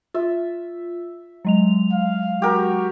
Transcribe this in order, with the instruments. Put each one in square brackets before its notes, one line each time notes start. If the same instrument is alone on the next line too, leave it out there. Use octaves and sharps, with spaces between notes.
[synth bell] F4 [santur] E5
[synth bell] F#3 G#3 F7
[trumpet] F5
[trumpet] F#4 [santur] G4 A#4